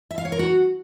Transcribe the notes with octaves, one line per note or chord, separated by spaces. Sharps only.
E5
F5
C#5
A#4
F#4